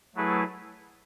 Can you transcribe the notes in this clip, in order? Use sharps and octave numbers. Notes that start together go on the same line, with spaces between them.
F#3 A3 E4 G#4 B4